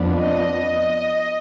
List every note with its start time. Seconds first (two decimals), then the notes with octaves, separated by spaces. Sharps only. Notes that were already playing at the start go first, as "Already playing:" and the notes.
Already playing: F2 F3 B3 D4
0.18 D#5